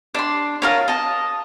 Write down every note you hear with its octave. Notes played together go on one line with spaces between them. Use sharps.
D4 C6
F4 A#4 C#5
D#5 A5